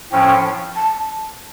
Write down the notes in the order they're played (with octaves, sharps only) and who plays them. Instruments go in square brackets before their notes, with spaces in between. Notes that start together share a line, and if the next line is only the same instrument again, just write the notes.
[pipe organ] A2 F3 C#4 [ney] G5
[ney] A5